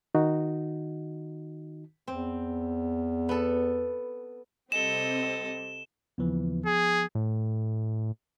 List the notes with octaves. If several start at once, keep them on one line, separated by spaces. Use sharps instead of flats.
D#3 D#4 F#4
E2 C4
B3 A4
C3 G3 C4 A4 D#5 E7 G7
D#2 C#3 E3 F3 B3
G#4 G#5
A2